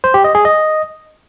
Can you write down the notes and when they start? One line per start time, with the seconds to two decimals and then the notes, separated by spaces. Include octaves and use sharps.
0.04 C5
0.14 G4
0.24 D#5
0.35 G#4
0.45 D#5